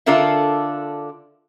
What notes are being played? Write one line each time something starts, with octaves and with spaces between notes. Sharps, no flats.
D3 D4 F4 A4 A#4 E5